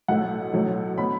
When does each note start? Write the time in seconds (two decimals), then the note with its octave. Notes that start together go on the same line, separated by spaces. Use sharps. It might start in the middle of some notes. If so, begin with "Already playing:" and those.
0.08 B1 A2 A3 F#5
0.53 B1 A2 F#3 A3
0.97 A2 F#3 B3 B5